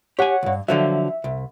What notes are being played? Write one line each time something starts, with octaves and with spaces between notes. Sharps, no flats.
G4 C#5 F#5 G#5
C#2 G2
D3 F3 F#3 E5
C2